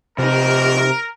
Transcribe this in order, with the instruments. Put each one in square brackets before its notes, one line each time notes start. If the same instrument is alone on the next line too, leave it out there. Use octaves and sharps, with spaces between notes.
[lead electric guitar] F2 D#4 [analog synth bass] C3 [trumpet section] A#4